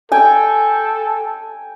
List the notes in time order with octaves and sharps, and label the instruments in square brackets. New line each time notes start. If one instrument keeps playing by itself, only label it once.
[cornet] A4 [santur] G5 G#5